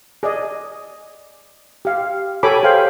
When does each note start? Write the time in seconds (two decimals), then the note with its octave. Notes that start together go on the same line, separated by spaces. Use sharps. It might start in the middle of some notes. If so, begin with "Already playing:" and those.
0.23 G#4 D5 D#5
1.85 G4 F5
2.43 G4 A4 C#5 G#5 B5 D6
2.63 G#4 C5 F5 G5